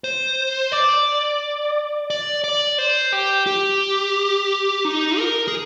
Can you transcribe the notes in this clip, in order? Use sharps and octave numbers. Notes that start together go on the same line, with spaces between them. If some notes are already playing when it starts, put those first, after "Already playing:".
C5
D5
D5
D5
C5
G4
G4
D#4
A#4
G#4